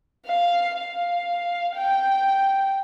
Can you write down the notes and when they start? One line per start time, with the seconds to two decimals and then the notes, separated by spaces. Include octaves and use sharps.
0.26 F5
0.77 F5
1.76 G5